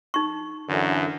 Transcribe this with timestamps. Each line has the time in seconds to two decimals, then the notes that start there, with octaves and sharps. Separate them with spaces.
0.14 D#4 C#6
0.69 F#2 D3 E3